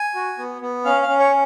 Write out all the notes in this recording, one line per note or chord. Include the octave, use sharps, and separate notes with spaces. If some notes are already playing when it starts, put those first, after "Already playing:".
Already playing: G#5
F#4
B3
B3
C#4 F5
F5
C#4
C#5